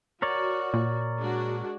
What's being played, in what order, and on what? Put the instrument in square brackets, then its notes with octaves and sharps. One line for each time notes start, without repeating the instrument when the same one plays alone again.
[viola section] F#4 [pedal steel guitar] A#4 C#5 D5
[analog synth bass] A#2
[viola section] G#3 D4 F#4